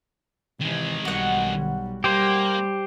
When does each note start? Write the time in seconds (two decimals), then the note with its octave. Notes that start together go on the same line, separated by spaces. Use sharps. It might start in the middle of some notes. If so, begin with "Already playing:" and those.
0.61 C3 D#3 E3 G#3
1.05 B1 G3 F#4 F#5
2.04 G3 A#3 G4 C5